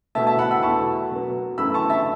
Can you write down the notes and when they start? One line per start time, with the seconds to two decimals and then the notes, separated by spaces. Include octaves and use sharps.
0.15 B2 A3 E5 A5
0.27 E5 A5
0.38 F#5 B5
0.51 B5 E6
0.63 E2 B2 A3 A5 C#6
1.11 B2 F#3 B3
1.58 F#2 E3 A3 B5 E6
1.74 A5 C#6
1.90 E5 A5